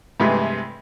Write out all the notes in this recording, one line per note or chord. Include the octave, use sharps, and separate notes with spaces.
G2 C3 E3 G#3 A3